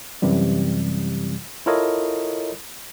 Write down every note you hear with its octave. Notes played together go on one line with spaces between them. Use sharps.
F#2 C3 E3 G3
E4 F4 A4 A#4 C#5 D#5